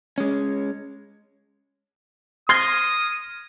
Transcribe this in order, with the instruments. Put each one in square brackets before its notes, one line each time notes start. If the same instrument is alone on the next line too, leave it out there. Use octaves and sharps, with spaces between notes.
[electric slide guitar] G#3 C#4
[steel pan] C6 [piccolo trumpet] D#6 [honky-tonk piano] F6 G#6 A#6